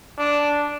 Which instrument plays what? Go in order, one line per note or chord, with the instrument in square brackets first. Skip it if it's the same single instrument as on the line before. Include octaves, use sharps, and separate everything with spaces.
[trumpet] D4